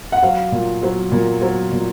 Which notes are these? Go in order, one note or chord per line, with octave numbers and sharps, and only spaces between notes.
F#5
F#3 F5
A#2
F#3
A#2
F#3
A#2